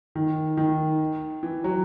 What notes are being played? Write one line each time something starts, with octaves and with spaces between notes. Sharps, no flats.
D#3
D#3
E3
F#3